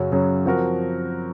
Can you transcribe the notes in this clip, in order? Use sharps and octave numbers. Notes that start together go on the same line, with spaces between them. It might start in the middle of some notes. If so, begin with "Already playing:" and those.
Already playing: F#2 C#3 F#3 C#4
F#2 C#3 F#3 C#4
F3 C4 F#4 A#4